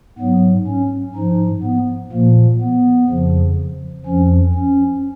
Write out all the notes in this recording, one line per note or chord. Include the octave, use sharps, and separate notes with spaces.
G#2 F#3 B3
C#4
G#2 F3 D#4
B3
A#2 F3 A#3
B3
F2 C#3 F3
F2 F3 C#4
C#4